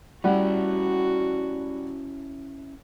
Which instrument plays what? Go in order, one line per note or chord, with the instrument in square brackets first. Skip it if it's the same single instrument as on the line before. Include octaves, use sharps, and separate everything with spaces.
[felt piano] G3 F#5 [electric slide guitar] C#4 E4 [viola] F#4